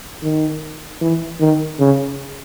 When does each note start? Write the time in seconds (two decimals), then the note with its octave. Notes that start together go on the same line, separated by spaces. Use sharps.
0.22 D#3
1.01 E3
1.40 D#3
1.79 C#3